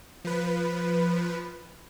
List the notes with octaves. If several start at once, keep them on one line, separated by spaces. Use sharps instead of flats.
F3 B4